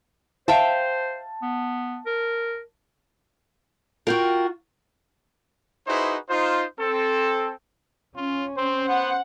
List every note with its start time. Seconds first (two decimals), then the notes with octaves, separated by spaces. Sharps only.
0.48 C5 E5 F5 G5 A5
1.42 B3
2.06 A#4
4.07 F4 F#4 A#4 G5
5.86 D#4 E4 F#4 G#4 B4 C5
6.29 D#4 F4 C5
6.78 C4 A4
8.16 C#4 F4
8.57 C4 C5
8.89 B3 F#5